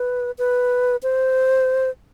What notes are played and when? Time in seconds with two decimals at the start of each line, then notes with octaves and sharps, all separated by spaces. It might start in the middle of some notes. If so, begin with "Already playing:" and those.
Already playing: B4
0.38 B4
1.03 C5